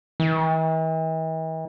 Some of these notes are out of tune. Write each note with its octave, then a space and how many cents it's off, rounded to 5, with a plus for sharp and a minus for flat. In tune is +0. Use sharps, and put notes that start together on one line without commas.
E3 -45